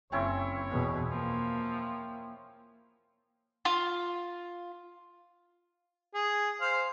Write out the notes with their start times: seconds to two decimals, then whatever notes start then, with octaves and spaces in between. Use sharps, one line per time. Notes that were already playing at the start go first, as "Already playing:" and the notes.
0.12 F#1 C4 C#4 E4 C#5
0.71 E2 B2
1.10 F3 A#3
3.65 F4
6.15 G#4
6.61 C5 F5